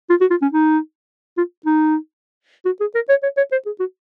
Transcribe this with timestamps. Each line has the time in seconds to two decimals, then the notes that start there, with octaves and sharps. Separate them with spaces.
0.10 F4
0.21 F#4
0.30 F4
0.42 C#4
0.52 D#4
1.38 F4
1.66 D#4
2.66 F#4
2.81 G#4
2.95 A#4
3.09 C#5
3.23 C#5
3.37 C#5
3.52 C5
3.66 G#4
3.80 F#4